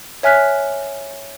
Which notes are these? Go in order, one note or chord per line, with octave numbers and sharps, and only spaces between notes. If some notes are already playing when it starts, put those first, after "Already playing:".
C#5 E5 G#5 F6 F#6 B6